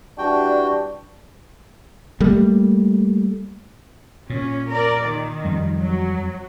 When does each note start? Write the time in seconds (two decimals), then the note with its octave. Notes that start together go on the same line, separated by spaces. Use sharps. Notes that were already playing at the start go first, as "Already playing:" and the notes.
0.18 E3 G3 D4 F#4 G5
2.20 G3 A3 A#3
4.30 A#2 C#4
4.70 A#4 D5
5.03 D#3
5.45 F2 G3
5.78 F#3